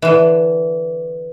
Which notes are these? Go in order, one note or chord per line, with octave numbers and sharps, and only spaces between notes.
D3 E3